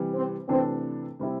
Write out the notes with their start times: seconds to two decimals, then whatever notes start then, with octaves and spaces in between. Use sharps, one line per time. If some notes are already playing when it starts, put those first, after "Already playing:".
Already playing: C3 E3 G3
0.14 C4
0.48 C3 E3 A3 C4 D4 A4
1.20 C3 G3 C4 E4